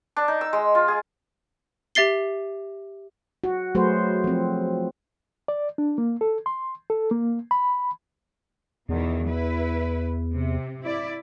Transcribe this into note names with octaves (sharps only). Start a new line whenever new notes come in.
D4
D#4
E6
G#3
F4
G#4
G4 E5 A6 C7 G7
F#4
F#3 A3 F#4 G#4 B4 C5
F3 C4
D5
D4
A#3
A4
C6
A4
A#3
B5
E2 B2 D#3 E3
E4 B4
C3
E4 D5